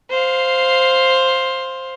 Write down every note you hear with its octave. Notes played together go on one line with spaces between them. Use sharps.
C5 F5